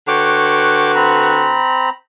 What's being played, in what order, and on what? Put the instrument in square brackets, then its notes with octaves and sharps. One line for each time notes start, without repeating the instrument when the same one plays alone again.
[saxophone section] D3 F#4 B4 [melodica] C#5 G5 D6
[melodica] C4 A#5 B5